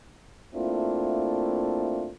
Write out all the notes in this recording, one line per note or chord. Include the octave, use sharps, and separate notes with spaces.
A3 A#3 C4 D4 E4 F4